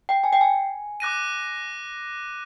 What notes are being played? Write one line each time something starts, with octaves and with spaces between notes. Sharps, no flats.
G5
G#5
G5
G#5
D6 F#6 A#6 D#7